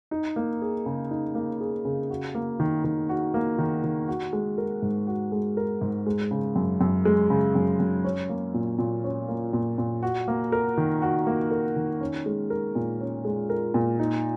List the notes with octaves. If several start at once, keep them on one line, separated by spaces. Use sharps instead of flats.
D#4
A#3
G#4
C#3
D#4
A#3
G#4
C#3
F#4
A#3
D#3
D#3
F#4
A#3
D#3
D#3
F#4
G#3
A#4
G#2
F#4
G#3
A#4
G#2
G#3
C#3
F#2
F#2
G#3
C#3
F#2
F#2
C#4
A#3
A#2
A#2
C#4
A#3
A#2
A#2
F#4
A#3
A#4
D#3
F#4
A#3
A#4
D#3
C#4
G#3
A#4
A#2
C#4
G#3
A#4
A#2
D#4